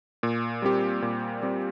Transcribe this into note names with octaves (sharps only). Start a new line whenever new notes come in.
A#2
G3 C4 G4
A#2
G3 C4 G4